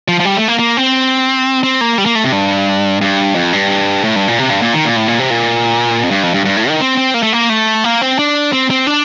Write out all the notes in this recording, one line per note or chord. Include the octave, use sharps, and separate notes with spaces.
F3
F3
G3
A3
A#3
A#3
C4
C4
A#3
G3
A#3
A3
C3
G2
G2
F2
G2
A2
G2
A#2
C3
G2
A#2
D#3
A#2
A2
A#2
C3
A#2
F2
G2
F2
G2
G2
A2
D#3
C4
C4
A#3
A3
A#3
A3
A#3
C4
D4
C4
C4
D4